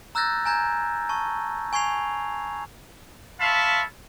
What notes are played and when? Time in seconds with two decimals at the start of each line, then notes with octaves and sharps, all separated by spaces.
0.15 A#5 E6 F#6 G6 A6 A#6
0.45 G#5 A#5 G6 G#6
1.09 A5 C#6
1.73 G#5 C#6 G#6 C7 F7
3.41 C#5 E5 F5 A5 B5 C6